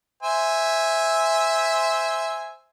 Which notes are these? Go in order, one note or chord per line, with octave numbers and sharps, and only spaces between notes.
C5 E5 G#5